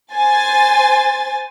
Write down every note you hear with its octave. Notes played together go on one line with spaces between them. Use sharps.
C5 G#5 A6